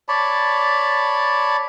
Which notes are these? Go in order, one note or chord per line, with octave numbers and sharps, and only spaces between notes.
C#5 D5 A5 B5